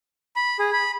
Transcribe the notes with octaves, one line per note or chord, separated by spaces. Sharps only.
B5
G#4
B5